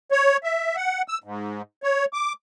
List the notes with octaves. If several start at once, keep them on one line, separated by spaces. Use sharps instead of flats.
C#5
E5
F#5
E6
G#2
C#5
D6